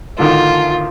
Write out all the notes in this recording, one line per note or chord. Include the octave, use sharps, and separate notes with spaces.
A1 D3 D#3 F4